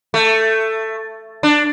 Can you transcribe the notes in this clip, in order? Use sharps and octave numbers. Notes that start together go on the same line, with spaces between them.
A3
D4